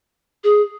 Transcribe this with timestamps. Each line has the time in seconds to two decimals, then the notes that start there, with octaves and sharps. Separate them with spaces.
0.44 G#4